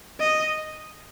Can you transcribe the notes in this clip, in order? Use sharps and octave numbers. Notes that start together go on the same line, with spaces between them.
D#5